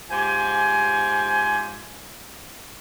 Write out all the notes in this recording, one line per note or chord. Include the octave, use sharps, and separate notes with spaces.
G#2 F4 G4 C5 G#5